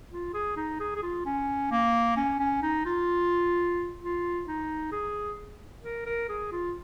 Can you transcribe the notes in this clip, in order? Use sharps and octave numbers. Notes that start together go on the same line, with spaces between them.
F4
G#4
D#4
G#4
G#4
F4
C#4
A#3
C#4
C#4
D#4
F4
F4
D#4
G#4
A#4
A#4
G#4
F4